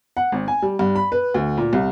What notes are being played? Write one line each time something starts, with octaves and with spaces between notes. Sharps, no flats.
F#5
G#1
G#5
G3
G2
B5
B4
D2
A#2
C2